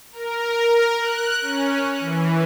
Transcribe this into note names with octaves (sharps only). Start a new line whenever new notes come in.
A#4
F#6
C#4
E3